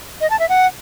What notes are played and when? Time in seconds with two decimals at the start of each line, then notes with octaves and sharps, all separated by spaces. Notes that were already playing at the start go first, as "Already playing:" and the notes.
0.21 D#5
0.30 A5
0.40 E5
0.49 F#5